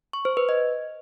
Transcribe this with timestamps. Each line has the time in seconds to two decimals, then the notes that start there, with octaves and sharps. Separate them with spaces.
0.13 C#6
0.25 C5
0.37 B4
0.49 D#5